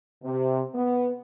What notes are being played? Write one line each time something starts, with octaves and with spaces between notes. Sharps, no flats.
C3
B3